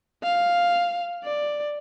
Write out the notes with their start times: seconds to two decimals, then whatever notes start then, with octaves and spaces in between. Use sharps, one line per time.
0.23 F5
1.24 D5